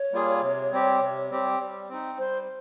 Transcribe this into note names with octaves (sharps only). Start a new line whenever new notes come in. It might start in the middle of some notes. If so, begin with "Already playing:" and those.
Already playing: C#5
G3 A#3 F4 G#4
C3
G3 C4 G4
C3
G3 C4 G4
G3
C4 D#4
G3 C5